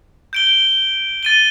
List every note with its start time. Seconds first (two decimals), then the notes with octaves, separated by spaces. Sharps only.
0.33 G6 D7 G7
1.23 A6 D#7 G7